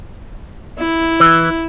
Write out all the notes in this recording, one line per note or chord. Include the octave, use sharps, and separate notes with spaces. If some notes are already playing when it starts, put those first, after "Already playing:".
E4
E3